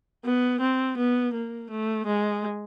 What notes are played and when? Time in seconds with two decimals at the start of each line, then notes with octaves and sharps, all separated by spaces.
0.25 B3
0.61 C4
0.98 B3
1.34 A#3
1.70 A3
2.07 G#3